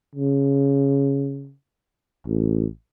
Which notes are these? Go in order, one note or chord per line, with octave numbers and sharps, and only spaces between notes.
C#3
A1